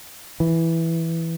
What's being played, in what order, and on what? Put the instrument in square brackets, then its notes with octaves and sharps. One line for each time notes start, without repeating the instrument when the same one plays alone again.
[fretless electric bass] E3